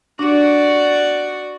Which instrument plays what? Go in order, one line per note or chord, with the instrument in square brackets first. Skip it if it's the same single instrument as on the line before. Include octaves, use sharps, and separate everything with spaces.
[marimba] D4 [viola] F#4 D5